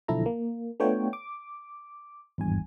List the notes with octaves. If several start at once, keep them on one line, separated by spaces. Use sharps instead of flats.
B1 D3 F3 E4 A4 A#5
A#3
A3 B3 D4 F4 C#5 G5
D6
G#1 E2 G2 G#5